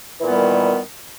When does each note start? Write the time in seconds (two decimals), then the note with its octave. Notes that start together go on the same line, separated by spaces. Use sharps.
0.19 E3
0.23 A#2
0.28 B3
0.32 G3
0.36 D#3